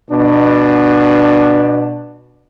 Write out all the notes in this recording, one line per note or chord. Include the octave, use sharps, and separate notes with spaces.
B2 D4